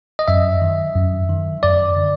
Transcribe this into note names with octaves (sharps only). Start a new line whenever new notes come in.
D#5
F#2 E5
D#3
F#2
D#3
F#2 D5
D3